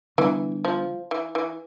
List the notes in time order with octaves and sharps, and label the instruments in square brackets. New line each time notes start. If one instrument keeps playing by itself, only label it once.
[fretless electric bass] D3 G3 B3 D4 [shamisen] E3
[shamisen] F3
E3
E3